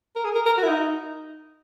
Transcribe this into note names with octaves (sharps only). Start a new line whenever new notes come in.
A#4
G#4
A#4
A#4
F#4
E4
D#4